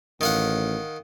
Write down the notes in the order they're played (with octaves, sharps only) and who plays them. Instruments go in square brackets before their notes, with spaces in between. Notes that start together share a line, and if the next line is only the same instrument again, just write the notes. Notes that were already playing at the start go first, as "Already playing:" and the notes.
[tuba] A1 [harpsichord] D#3 F5 F#5